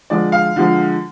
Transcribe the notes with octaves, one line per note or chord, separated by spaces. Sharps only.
D3 F3 G#3 D5
F5
D3 F3 G#3